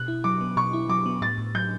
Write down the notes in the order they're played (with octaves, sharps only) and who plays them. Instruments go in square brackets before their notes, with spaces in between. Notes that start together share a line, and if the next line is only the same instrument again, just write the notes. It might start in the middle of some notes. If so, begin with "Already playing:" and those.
Already playing: [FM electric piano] B2 [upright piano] F#6
[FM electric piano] E4
[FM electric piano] F#3 [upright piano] D6
[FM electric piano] B3
[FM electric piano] B2 [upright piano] C#6
[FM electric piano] E4
[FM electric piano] F#3 [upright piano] D6
[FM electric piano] B3
[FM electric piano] A2 [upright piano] A6
[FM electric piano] A2
[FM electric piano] F#3 [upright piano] G6